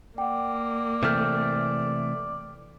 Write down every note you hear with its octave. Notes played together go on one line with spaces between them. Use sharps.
A#3 D5 F#5 G5
C3 E3 A3 G5 F6 G6